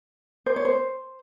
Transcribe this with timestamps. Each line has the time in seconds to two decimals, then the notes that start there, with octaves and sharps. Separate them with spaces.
0.46 C5
0.56 C#5
0.65 C5